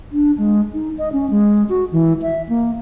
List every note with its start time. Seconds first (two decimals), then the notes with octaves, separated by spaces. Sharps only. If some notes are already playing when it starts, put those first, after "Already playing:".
0.12 D4
0.38 G#3
0.74 D#4
0.98 D#5
1.13 C#4
1.31 G#3
1.69 F#4
1.92 E3
2.22 E5
2.49 A#3